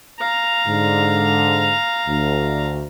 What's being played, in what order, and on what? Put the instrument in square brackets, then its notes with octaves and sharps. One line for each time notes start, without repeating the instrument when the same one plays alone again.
[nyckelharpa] F5 A#5
[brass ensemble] G#2 D3
D2